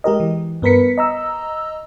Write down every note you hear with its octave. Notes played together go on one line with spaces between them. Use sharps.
G#3 G4 A#4 D#5
E3
G2 B3 A#4 B4 B6 C#7
D#5 A#5 E6